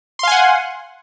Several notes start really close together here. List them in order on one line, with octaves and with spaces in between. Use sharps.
C6 F5 G#5 F#5